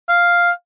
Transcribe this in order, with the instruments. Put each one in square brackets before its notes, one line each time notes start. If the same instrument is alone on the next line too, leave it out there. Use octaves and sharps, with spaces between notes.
[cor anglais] F5